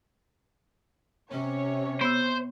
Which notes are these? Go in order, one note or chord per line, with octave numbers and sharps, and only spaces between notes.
C3 C#4 C#5
B3 C5 E6